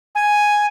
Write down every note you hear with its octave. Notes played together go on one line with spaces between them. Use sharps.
G#5